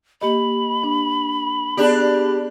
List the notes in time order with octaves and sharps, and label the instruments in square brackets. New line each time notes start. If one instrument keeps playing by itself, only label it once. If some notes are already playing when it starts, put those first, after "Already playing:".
[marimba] A#3 G4 D#5 [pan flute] B5
[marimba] D4
[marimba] B3 G#4 D5 [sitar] D4 G4